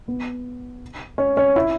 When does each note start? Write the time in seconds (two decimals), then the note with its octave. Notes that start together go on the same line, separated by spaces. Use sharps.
0.08 B3
1.18 C#4
1.37 C#4
1.56 E4